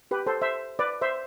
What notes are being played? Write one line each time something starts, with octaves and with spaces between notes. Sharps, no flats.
G4 B4
A4 C5
C5 E5
B4 D5
C5 E5